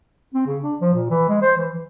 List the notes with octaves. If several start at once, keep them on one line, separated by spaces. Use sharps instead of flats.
C4
C#3
D4
F3
A#2
E3
G#3
C5
E3
E3